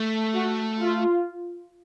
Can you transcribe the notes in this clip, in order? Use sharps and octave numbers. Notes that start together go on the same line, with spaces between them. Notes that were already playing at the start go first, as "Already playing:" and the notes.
Already playing: A3
F#4
F4